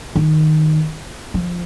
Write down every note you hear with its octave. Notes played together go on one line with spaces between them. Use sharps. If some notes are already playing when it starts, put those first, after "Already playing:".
D#3
F3